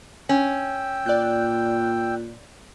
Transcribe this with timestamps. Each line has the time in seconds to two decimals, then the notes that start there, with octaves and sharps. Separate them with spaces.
0.29 C#4 G5 E6
1.06 A#2 D5 F#6 G6